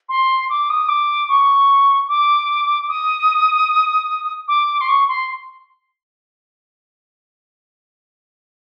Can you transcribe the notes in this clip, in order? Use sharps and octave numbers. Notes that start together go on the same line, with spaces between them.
C6
D6
D#6
D6
C#6
D6
D#6
D6
C6
C#6
C6